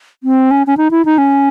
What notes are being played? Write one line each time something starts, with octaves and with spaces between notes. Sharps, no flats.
C4
C#4
C#4
D#4
E4
D#4
C#4